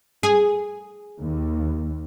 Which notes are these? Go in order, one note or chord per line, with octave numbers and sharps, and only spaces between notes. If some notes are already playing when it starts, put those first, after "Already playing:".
G#4
D#2